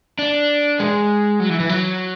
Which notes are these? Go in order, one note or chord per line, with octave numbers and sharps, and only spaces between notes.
D4
G#3
F#3
E3
E3
F#3